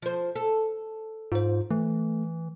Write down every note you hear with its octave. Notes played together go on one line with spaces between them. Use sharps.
F3 C5
A4
G#2 F4 C5
E3 A3